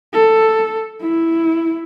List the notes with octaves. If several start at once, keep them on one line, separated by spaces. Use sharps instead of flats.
A4
E4